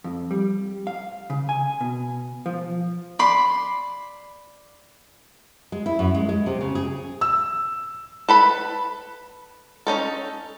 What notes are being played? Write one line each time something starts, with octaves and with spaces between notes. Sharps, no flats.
F2
G3
F5
C#3
G#5
B2
F3
D5 B5 C6
G#3
E4
F#2
G#3
G#3
C3
C#3
G#4
E6
A4 B4 B5
C#4 D#4 A4